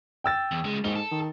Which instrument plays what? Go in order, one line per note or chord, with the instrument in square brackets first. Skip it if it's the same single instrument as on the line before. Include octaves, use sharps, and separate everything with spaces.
[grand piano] G5 E6 A6
[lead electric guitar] E2
C#2 G#3
[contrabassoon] G#2 [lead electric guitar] D#4 G4 [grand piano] G7
[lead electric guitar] A4
[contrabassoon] D#3